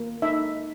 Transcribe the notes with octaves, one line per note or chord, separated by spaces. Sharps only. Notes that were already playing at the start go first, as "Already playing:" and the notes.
Already playing: A#3
D#4 E5